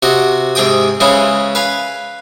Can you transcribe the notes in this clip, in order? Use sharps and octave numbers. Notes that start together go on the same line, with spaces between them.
C3 F#4 D#5
G#2 C3 G#4 G5 D#6
C#3 E3 G#3 C#4 E4 C5
B4 F5 G#5